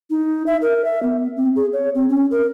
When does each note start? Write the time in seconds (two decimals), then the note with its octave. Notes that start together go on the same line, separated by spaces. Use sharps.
0.10 D#4
0.46 E5
0.62 A#4
0.85 E5
1.03 B3
1.36 C4
1.56 G#4
1.73 C#5
1.95 C4
2.09 C#4
2.31 A#4